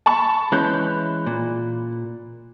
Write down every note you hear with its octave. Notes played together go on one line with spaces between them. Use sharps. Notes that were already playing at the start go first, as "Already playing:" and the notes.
A5 B5 C#6
E3 G#3 C#4 B5 F#6 G6
A#2